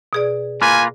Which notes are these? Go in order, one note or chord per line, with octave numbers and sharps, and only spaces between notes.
B2 G#4 D5
A#3 F4 B4 G#5